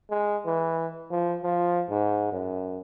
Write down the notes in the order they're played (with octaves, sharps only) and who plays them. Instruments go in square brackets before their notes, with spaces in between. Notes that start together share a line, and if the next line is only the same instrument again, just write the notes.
[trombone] G#3
E3
F3
F3
G#2
F#2